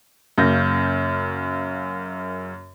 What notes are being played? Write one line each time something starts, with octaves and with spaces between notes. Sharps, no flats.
F#2 C#3 A#3 G6 A#6